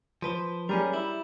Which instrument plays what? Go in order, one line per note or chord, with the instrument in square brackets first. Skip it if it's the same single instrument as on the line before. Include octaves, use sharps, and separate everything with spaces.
[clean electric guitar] F3 B4 C5
[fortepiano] G3 [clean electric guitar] C#4 G#4 A#4
[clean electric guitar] E4